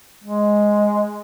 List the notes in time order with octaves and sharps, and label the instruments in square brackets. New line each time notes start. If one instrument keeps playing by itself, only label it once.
[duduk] G#3